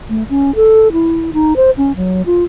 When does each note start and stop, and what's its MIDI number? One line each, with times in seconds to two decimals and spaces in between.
0.10 0.24 57
0.30 0.54 61
0.55 0.92 69
0.92 1.31 64
1.33 1.56 63
1.56 1.70 72
1.77 1.92 61
1.96 2.22 54
2.26 2.44 65